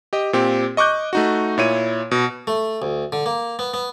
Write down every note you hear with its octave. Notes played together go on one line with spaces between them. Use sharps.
G4 D#5
A#2 C4 G4
D#5 C#6 D6 F#6 G6
A3 D#4 F#4
A#2 E4 C#5 D#7
B2
A3
D2
D3
A#3
B3
B3